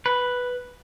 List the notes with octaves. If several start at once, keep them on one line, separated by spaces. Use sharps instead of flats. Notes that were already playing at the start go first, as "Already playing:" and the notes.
B4